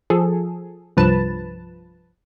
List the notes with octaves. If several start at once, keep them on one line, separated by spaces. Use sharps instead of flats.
F3 G#4 A4
C2 G2 F3 B4 A5